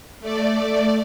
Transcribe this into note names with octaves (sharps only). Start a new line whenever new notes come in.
A3 D5